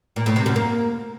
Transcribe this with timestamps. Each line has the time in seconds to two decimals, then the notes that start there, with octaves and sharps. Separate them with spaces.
0.16 A#2
0.26 A2
0.36 C3
0.46 F#2
0.56 A#3